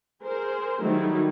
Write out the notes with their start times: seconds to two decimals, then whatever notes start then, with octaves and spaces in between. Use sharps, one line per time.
0.22 G#4 A#4 C5
0.82 D#3 F#3 G3 A3 D#4 E4